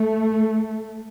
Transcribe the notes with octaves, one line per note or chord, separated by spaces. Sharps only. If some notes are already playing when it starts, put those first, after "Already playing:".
Already playing: A3